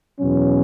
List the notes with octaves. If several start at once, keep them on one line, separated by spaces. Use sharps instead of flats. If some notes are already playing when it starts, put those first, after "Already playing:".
E2 B2 F#3 C#4